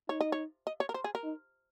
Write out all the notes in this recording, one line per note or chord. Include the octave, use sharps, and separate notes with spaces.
D#4 C#5
D#5
C#5
D#5
C#5
A#4
C5
G#4
A#4
D#4